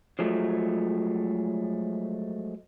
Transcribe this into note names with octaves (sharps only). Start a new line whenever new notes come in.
F3 F#3 G#3 A3